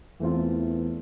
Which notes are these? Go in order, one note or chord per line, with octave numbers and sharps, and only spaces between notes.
E2 E3 A3 C4 F4